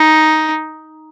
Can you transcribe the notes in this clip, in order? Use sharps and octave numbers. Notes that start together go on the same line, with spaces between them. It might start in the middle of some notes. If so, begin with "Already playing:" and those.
Already playing: D#4